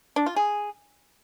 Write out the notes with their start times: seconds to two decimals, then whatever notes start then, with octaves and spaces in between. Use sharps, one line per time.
0.16 D4
0.26 F4
0.36 G#4